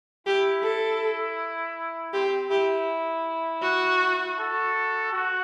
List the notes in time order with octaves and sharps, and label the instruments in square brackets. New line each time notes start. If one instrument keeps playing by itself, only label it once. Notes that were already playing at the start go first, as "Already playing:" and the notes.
[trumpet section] E4 [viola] G4
[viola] A4
[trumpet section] C4 [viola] G4
[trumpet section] E4 [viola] G4
[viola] F#4
[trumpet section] F#4 A4
F#4